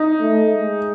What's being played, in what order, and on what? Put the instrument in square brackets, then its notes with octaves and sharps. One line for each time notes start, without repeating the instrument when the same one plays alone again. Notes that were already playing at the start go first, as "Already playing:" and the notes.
Already playing: [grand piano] D#4
[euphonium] A3
G#3